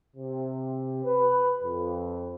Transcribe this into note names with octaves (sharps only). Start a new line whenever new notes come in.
C3
B4
F2